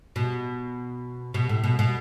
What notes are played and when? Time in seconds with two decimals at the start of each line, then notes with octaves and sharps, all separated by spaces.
0.16 B2
1.34 B2
1.49 A2
1.64 B2
1.79 B2